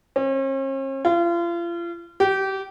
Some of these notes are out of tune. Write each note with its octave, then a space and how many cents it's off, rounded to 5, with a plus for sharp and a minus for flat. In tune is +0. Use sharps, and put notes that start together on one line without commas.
C#4 -45
F4 -35
G4 -25